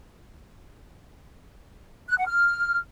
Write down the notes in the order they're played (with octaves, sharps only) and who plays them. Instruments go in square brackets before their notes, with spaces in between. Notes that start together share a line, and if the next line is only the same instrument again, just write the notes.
[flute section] F#6
F#5
F6